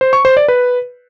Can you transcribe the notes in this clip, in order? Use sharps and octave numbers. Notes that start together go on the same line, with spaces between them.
C5
C#6
C5
D5
B4